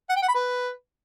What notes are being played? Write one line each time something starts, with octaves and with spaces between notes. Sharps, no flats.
F#5
G5
F#5
B5
B4